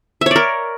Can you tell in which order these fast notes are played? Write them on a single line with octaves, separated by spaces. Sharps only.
E5 C#5 D5 A#4